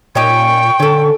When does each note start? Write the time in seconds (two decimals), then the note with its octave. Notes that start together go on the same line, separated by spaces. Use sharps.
0.15 A#2 C#4 D#4 G4 G5 C#6
0.80 D3 C#4 A4